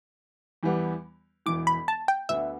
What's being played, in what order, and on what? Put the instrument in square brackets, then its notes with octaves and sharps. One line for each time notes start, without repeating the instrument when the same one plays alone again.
[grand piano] E2 E3 G3 B3
[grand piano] E1 E2 E3 [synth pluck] D6
[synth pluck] B5
A5
G5
[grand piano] D2 D3 B3 [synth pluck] E5